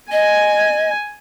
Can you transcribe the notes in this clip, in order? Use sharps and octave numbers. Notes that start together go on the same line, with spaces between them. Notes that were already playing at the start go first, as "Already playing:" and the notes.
D#5 G#5